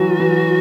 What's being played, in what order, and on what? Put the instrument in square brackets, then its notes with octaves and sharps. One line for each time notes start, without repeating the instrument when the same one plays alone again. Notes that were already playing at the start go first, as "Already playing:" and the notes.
Already playing: [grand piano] E3 F#3 [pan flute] F#4
[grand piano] E3